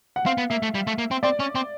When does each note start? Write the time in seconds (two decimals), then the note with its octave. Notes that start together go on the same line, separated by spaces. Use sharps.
0.16 F#5
0.26 C4 F5
0.38 B3
0.50 A#3 E5
0.63 A3
0.75 G3
0.87 A3
0.98 A#3
1.11 C4
1.23 C4 D5
1.40 C#4
1.55 C4